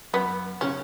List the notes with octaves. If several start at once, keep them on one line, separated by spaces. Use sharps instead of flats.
F#2 B3
C#3 C#4